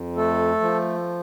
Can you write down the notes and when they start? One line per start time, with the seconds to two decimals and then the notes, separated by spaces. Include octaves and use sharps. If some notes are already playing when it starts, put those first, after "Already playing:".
Already playing: F2
0.16 A3 A4
0.61 F3